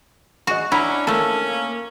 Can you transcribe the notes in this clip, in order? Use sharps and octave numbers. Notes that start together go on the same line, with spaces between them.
F#4 G#4 D#5
C#4 D4 E4 F#5 A#5
A3 A#3 C#4 A4 A#4 A5